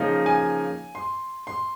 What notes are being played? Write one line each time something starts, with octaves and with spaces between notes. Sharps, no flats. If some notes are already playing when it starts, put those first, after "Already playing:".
Already playing: C#3 F3 A#3 D#4
G#5
C6
C6